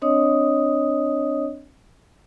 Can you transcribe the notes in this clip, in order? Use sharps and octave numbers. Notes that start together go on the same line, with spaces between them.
C4 D4 C#5 D#5 D#6